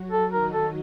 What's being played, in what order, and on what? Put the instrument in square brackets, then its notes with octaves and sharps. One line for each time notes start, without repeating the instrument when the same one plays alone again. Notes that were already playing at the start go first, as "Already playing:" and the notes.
Already playing: [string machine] F#3 F#4
[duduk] A4
[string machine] D#3 D#4 [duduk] A#4
[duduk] A4